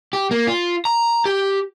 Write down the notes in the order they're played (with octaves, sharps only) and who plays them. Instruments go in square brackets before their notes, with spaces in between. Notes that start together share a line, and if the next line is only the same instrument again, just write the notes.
[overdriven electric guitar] G4
A#3
F4
A#5
G4